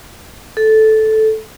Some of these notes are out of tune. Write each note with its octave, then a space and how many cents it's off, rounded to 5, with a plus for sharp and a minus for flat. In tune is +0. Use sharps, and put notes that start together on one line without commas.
A4 -10